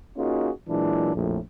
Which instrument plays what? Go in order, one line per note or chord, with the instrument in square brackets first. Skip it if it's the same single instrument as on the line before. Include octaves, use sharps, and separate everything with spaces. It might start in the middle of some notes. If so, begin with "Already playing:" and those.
[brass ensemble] A#3 C#4 D#4 F4 F#4 G#4
A#2 E3 F#3 G#3 D4 E4
A#1 F2 A2